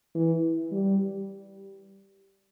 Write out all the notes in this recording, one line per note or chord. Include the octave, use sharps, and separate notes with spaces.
E3
G3